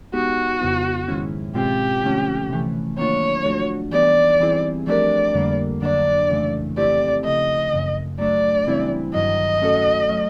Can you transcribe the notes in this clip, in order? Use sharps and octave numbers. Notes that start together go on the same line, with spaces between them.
G#3 B3 D#4 F#4 G4
F2 C#3 F#3 B3 E4
G#2 D#3 G#3 C#4 E4
B2 G#3 C4 F4 G4
D3 F3 A3 C#4
C3 E3 A3
D#3 F#3 A#3 D4 F4 C#5
C3 F3 A3 D4 F#4
E3 G3 B3 D#4 G4 D5
E3 G3 C4 E4 G#4
F3 A3 D4 G4 A#4 D5
F2 D3 G3 A#3
F2 D3 F#3 A#3 D4 D5
F2 C#3 E3 A3
F3 A3 C4 E4 G4 D5
C#3 F3 A3 D#5
F#2 C#3 E3
F#3 A3 D4 D5
C#3 E3 G3 C4 E4
G2 D#3 F#3 D#5
A3 C#4 F#4 A4
F#3 A3 C#4